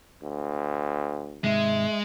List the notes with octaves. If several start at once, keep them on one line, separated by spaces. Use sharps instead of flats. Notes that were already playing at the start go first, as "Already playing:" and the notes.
D2
G#2 C3 D#3 G#3 E5